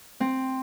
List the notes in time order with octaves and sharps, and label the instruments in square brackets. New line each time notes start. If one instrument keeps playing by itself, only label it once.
[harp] C4